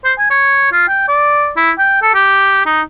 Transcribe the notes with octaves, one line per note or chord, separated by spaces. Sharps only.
C5
G#5
C#5
F4
G5
D5
E4
G5
A4
G4
D#4